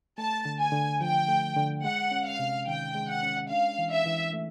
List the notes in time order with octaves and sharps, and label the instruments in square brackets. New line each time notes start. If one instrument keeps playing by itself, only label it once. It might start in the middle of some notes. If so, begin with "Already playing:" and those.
[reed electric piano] A3 [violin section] A5
[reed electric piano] D3
[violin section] G#5
[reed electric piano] D3
[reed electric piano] F3 [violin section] G5
[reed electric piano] A3
D3
[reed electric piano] G#3 [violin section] F#5
[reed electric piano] C#4
[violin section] F5
[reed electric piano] C3
[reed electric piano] D#3 [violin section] G5
[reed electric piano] G#3
[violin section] F#5
[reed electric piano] C#4
[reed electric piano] D4 [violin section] F5
[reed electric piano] E3
[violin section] E5
[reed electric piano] E3
A3